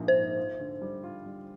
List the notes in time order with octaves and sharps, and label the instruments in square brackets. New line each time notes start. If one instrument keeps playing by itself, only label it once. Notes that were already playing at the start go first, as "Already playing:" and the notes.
Already playing: [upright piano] A#1 G#2 F3 A#3
[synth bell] C5
[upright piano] G#2
F4
D3
G3
F4
G3